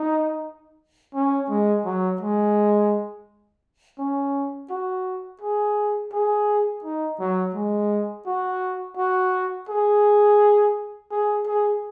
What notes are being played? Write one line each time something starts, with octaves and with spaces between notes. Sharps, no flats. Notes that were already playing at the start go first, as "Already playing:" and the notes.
Already playing: D#4
C#4
G#3
F#3
G#3
C#4
F#4
G#4
G#4
D#4
F#3
G#3
F#4
F#4
G#4
G#4
G#4